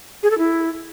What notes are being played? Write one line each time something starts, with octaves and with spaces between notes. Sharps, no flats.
G#4
A4
E4